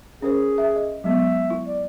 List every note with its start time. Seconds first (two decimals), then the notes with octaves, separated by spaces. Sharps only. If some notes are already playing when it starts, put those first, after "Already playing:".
0.22 C#4 G#4 A#4 C5
0.58 E5
0.76 D#5
1.04 F#3 G#3 B3 E5
1.50 E4
1.66 D5